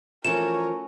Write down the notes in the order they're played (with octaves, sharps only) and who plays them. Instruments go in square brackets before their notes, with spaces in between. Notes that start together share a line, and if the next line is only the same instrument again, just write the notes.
[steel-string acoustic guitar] E3 F3 [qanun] A3 C#4 F#4 [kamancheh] A#4 C#5 [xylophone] E7